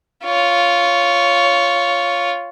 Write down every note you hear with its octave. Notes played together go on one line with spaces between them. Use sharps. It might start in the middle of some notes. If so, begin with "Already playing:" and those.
F4 C#5